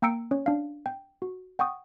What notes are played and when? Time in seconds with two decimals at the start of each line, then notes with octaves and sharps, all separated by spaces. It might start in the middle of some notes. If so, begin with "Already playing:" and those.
0.02 A#3 G5 A#5 E6 C#7 D7
0.31 C#4 C#5
0.46 D4 F5
0.86 G5
1.22 F#4
1.59 F#5 G5 C#6 D#6